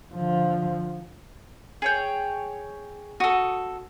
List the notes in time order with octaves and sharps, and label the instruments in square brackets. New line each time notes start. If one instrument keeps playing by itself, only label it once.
[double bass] D3 F3
[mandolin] G#4 C#5 G5
[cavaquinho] F#4 A4 [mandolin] D#6